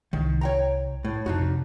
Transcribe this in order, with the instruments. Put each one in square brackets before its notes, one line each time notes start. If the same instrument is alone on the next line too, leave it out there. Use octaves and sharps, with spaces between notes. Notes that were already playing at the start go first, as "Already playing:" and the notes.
[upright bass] C2 [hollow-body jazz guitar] D#3
[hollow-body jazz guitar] C#5 G5 A#5
A2
[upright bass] F2 C3 [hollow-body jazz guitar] D4 D#4 F#4